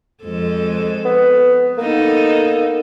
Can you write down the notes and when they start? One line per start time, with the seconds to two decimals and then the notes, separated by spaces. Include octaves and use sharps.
0.23 F2 G#3 A4
1.05 B3
1.78 A#3 B3 D#4 A4